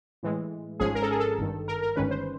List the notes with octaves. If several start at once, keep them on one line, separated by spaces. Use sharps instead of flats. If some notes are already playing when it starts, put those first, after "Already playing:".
A2 E3 G#3
G#1 G#2 F3 G#3 C#4 G#4
A#4
A4
G#4
A4
G#1 G2 D#3
A#4
A#4
G1 G2 D#3 G#3 C#4 B4
C5